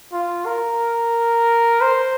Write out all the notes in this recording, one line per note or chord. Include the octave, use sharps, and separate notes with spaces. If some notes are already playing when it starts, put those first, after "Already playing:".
F4
A#4
C5